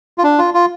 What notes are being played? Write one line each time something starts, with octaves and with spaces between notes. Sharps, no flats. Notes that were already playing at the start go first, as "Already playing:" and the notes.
F4
D4
F4
F4